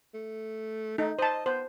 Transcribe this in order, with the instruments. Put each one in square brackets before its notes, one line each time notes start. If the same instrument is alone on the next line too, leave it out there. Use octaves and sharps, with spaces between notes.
[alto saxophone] A3
[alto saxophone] A3 [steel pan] D#4
[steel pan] C5 A5 [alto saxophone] D#5
[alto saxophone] B3 [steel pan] C5